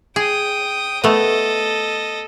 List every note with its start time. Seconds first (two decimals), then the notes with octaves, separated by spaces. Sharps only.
0.16 G#4 G5 D#6
1.04 A3 B3 A4 D#5